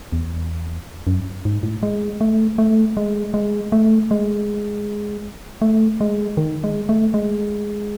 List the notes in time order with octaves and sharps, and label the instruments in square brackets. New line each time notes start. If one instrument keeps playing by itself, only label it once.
[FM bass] E2
F#2
G#2
A2
G#3
A3
A3
G#3
G#3
A3
G#3
A3
G#3
D#3
G#3
A3
G#3